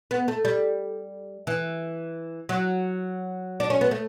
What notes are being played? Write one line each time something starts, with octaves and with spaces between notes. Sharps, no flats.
B3
A3
G3
E3
F#3
D4
C#4
B3
A3